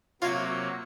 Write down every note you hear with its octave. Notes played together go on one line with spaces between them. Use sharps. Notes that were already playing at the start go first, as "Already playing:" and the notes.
C3 F#3 A#3 F4 C#5 E5 F5 G#6